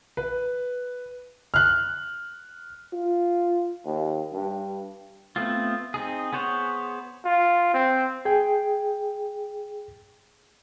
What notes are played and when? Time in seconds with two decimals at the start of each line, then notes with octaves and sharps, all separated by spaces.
0.17 B4
1.54 F6 F#6
2.93 F4
3.85 D#2
4.33 G2
5.36 A3 B3 C4 F4
5.94 C4 D#4 G#4
6.33 B3 G#4 C5 C#5 F#5
7.25 F4
7.74 C4
8.25 G#4 G5